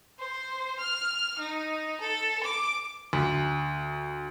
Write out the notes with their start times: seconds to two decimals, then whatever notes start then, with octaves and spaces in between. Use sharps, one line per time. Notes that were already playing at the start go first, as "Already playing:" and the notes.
0.19 C5
0.79 F6
1.39 D#4
2.01 A4
2.43 D6
3.13 D2